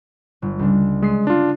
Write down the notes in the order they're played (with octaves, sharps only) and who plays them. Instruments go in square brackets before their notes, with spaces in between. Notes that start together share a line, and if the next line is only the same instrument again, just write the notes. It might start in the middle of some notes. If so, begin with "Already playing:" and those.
[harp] G1
C#2 D4
[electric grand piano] G#3 [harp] D#6 C7 D#7
[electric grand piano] D4 F4